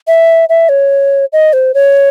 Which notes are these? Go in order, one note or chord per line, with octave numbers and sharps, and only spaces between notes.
E5
E5
C#5
D#5
C5
C#5